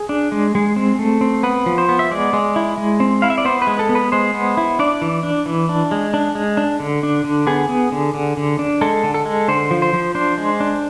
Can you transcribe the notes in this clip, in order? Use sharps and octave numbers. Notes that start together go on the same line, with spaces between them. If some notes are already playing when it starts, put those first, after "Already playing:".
Already playing: G#4
D4
G#3
G#3
C4
A3
C4
B3 B4
F3
C5
B3
E5
G#3 D5
G#3
E4
G#3
C4
E4 F5
E5
D5
B3 C5
B4
G#3
A4
B3
B4
G#3 C5
B3
E4
D4 D5
E3
D4
E3
D4
G#3
D4
G#3
D4
D3
D4
D3
B3 G#4
B3
D3
D3
D3
D4
G#3 A4
D3
A4
G#3
D3 C5
F3
C5
F3
D4 C5
G#3
D4